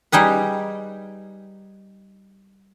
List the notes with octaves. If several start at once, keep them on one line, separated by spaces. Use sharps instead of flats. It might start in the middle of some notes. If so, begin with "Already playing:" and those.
G3 D#4 G#4 B4